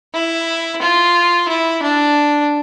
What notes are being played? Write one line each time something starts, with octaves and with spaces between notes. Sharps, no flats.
E4
F4
E4
D4